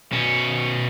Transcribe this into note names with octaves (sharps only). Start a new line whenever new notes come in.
B2 C#4